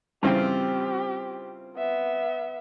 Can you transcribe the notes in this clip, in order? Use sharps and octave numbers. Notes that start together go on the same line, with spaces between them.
G2 C#3 E3 C4 F4 G4
B3 E5